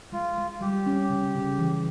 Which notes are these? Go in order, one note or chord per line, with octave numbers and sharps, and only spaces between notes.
G#3 F4
G#3
G3 G4
C#4
C#3
C#3
E3